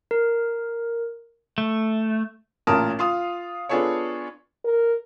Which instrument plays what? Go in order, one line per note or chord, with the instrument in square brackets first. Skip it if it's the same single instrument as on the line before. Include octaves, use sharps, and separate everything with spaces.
[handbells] A#4
[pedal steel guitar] A3
[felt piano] A1 A#2 C#4 A#4 A5 D#6
F4 F5 C6 D#6
B3 D4 F4 G#4 A4 C#5
[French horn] A#4